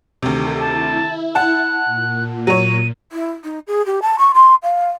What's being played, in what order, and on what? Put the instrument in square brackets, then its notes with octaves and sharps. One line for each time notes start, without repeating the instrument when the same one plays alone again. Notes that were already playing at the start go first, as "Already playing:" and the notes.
[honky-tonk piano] D2 C3 [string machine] D#3 G4 A4
[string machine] E4 [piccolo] A5
[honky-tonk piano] F#5 A5 [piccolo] F#6
[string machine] A#2
[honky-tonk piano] F#3 C#5 [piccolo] D#7
[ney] E4
D#4
G#4
G4
A5
C#6
C6
F5